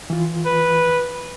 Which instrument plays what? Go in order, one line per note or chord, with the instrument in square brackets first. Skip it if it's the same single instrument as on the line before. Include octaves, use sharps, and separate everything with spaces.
[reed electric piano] E3 F4
[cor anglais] B4